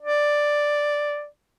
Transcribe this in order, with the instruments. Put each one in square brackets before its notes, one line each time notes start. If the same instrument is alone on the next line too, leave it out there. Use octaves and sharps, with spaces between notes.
[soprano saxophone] D5